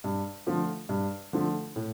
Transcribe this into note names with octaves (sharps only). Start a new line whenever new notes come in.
G2
D3 F3 A3
G2
D3 F3 A3
A2